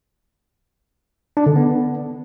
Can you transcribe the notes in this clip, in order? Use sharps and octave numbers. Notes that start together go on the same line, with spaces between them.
D4
D3
B3